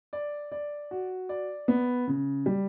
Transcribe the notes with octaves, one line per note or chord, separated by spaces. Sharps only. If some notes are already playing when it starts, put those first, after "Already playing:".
D5
D5
F#4
D5
B3
C#3
G3